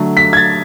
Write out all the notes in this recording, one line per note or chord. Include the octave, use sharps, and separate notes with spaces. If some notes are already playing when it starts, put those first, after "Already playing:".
Already playing: D3 F#3 A3
B6
G#6
A6